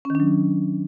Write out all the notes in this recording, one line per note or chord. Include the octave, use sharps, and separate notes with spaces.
D#3 F#3 C#4 D4